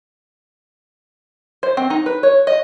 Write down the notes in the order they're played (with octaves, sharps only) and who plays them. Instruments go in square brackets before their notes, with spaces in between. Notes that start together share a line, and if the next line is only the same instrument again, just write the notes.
[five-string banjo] C5
C4
D#4
B4
C#5
D#5